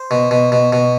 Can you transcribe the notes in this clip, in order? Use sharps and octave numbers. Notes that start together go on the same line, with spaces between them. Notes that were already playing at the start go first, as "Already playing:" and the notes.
Already playing: C5
B2
B2
B2
B2